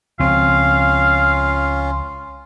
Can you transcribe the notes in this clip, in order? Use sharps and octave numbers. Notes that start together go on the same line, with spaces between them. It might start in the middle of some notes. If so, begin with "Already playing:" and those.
C#2 F3 C4 C#4 F4 F5